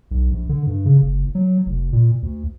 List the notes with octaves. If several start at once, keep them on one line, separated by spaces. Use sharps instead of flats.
B1
A#1
D3
G2
C#3
F#1
F#3
F1
A#2
D2